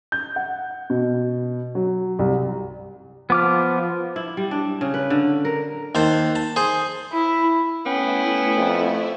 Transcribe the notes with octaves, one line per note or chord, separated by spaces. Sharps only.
G6
F#5
B2
F#3
C2
F3 B3 D6 F6
E4
G3
D4
C#3
B4
D3
A#4
D#2 C5 A5
A5
G#4 C5
E4
A3 B3 C#4 E4 G5
F2